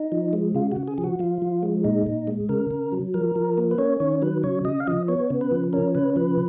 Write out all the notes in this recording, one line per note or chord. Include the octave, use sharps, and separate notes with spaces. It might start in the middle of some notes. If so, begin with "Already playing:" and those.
Already playing: D#4
F3
G#3
C#3 F4
C#3 F#4
G#4
F3 G#4
F#4
F3 F4
F3
G#3
A#2 D#4
A#2
G#3
C#3 A#4
C#3
F#3
F3 A#4
F3
A#3
B4
C#4 C#5
D#3 C#5
F#3 B4
C#3 C#5
C#3 D#5
F5
F3 D#5
B3 C#5
C#3
B4
F3
C#4 A#4
C#3 B4
F3 B4